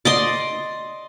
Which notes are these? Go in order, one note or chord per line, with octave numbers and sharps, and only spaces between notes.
D5 D#5 C6